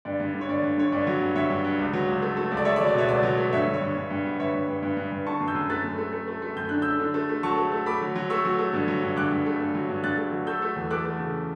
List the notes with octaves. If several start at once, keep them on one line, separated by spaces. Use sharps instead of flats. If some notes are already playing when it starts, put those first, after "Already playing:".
G2 D5
G2
D3
C#5
G2 D5
G2
D3 C#5
G2 D5
F#3
G2
G2 C#5 E5
G2
G2
C#2
F#3
C#2
A3
A3
C#2
D5
A3 C#5 E5
D5
F#3
D5
B2 C#5 E5
C#2 D5
F#3
A3
G2 C#5 E5
G2
C#5
G2
G2
G2
B3
G2 C#5 E5
G2
G2
G2
G2
G2
D3 A5 C#6
F#2
E6 G6
F#2
A3 F#6 A6
F#2
A3
A3
A3
A3
F#2 G6
D3 F#6
D3 E6 G6
D3
A3
A3
F#3 A5 C#6
A3
A3
A3 B5 D6
F#3
F#3
A3 C#6 E6
F#3
A3
G2
F#3
G2
G2 D6 F#6
G2
A3
G2
F#3
G2
G2 F#6 A6
A3
F#3
A3 E6 G6
A3
E2
A3 D6 F#6
A3
C#3